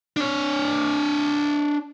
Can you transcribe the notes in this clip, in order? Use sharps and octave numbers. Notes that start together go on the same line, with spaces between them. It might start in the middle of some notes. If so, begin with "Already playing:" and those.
D4 C#5